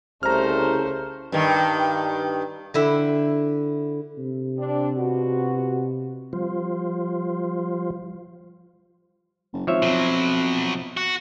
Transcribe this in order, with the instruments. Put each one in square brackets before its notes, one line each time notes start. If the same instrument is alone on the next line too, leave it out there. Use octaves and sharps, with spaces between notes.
[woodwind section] C2 [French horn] C#3 [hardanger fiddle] A3 C5 [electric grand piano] A#5 F6
[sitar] G2 D#3
[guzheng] D3 E4 E5 G5
[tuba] C3
[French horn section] C4 D4
B2 F4 F#4
[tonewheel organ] F3 G3 F4 C5
[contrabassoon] F#1
[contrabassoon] G#1 [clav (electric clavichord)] F3 C#5 E5
[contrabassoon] F2 [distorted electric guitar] B2 F#3
[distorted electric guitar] F#4